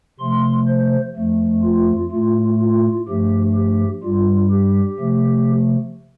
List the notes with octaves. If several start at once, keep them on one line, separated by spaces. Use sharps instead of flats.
C3 F3 A3 C6
C5
F2 F3 A3
F4
A2 A3 F4
F4
G2 F3 A3 G4
G4
G2 G3 F4
G4
C3 F3 A3